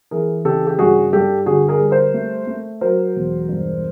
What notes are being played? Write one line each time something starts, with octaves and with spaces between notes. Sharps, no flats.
E3 G#4 A#4
C#3 G4 A4
G4
G2 F#4 G#4
G2 G4 A4
D3 F#4 G#4
G#4 A#4
G3
A#4 C5
A3
A3
F#3 A#4 C5
E1
G2